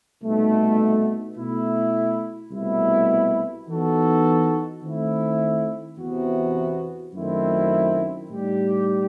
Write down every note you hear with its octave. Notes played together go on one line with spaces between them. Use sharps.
C2 B2 A3 D#4
B2 A3 E4
C2 B2 A3 E4
E3 B3 D#4 F#4 A4
D#3 A3 C4 E4
E2 C3 E3 B3 F#4
F#2 D#3 A3 C4 E4
A2 G3 D#4 G4